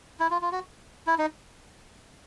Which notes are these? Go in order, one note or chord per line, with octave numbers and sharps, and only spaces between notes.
E4
F4
F4
F#4
E4
D#4